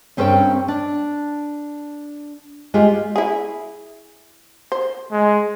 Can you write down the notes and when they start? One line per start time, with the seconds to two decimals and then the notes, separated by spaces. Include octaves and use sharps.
0.17 G2 C4 C#4 A#4 C#5 G5
0.68 D4
2.74 G#3 F4 G4
3.16 E4 G#4
4.72 C5
5.11 G#3